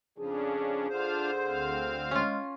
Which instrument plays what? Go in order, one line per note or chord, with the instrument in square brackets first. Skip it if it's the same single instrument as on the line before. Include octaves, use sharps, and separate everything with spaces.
[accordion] F2 C#3 F3 [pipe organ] C#4 D4 [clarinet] G#4
[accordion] D3 C5 [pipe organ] D4 F4 F5
[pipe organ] D2 C4 F5
[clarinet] G#3 [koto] C#4 F4